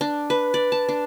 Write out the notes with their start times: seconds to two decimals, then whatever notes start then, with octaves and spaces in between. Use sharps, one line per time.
0.01 D4
0.30 B4
0.54 D5
0.72 A5
0.89 D4